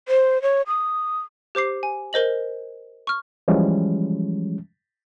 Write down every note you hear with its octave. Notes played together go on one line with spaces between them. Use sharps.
C5
C#5
D#6
G4 C5 D6 C7
G#5
A#4 C5 D#5 F#7
C#6 F6
E3 F3 G3 G#3 C#4